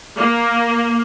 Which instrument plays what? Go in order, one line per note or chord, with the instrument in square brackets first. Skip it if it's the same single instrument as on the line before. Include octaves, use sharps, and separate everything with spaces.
[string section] A#3